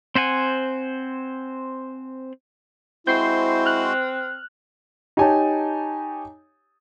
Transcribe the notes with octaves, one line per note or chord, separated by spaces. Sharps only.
C4 C5 F#5 G#5
G#3 C4 E4 F#4 C5 G6 C7
F6 F#6
D#4 G4 C#5 G#5 A5